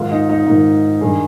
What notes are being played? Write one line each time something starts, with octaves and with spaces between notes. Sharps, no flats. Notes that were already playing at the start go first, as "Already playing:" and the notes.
Already playing: G#2 D#3 F4
D#4
D#4
G#2 D#3
G2 D#3 G#4